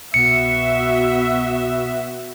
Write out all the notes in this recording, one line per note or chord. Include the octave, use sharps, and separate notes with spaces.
C2 B2 B3 F#4 E5 C#7